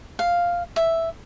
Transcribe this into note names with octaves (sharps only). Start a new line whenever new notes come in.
F5
E5